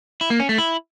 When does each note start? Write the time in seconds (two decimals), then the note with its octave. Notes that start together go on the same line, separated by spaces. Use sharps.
0.21 E4
0.30 A#3
0.40 C#4
0.49 A3
0.58 E4